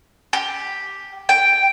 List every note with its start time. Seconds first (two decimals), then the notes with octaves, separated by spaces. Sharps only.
0.33 G4
1.29 G5